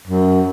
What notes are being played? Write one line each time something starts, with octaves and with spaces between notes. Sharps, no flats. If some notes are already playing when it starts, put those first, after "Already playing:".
F#2